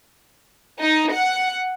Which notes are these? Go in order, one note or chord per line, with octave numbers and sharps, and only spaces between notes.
D#4
F#5